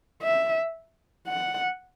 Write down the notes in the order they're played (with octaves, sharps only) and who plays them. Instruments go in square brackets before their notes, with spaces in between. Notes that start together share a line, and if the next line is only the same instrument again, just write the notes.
[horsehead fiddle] E5
F#5